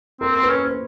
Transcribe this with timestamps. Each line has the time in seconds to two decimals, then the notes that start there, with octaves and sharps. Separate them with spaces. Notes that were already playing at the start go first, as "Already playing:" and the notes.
0.21 C4 A#4
0.36 C4
0.43 B4
0.50 C#4
0.65 C5